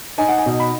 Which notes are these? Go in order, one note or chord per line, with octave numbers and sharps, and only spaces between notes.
D#4 G#5
F#5
G#5
B2
B5